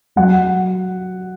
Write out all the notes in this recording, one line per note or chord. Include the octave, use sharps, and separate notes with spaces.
F#3 F#5